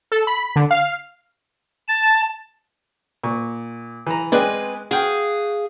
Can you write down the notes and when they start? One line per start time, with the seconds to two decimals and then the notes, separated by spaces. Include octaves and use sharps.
0.12 A4
0.27 B5
0.56 D3
0.71 F5
1.88 A5
3.24 A#2 C#6
4.07 E3 A#5
4.32 G#3 C4 G#4 B4 D5 G#5
4.91 F#4 G#4 F5 G5